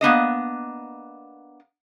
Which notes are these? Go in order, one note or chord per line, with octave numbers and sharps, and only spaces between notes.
A#3 B3 D4 D#5